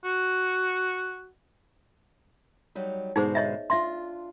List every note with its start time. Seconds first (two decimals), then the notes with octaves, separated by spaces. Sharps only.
0.04 F#4
2.75 F#3 G3 D#4
3.16 G#2 B2 D3 D#4 G#4 C5
3.35 C#5 D#5 E5
3.70 D4 F4 E5 C6